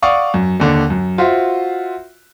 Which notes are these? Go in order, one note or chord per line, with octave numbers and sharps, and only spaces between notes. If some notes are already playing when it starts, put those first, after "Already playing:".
D5 F5 F#5 C#6 D#6
F#2
D#2 D3
F#2
F4 F#4 C5 E5